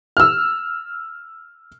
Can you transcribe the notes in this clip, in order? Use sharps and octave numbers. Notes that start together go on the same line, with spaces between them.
E6 F6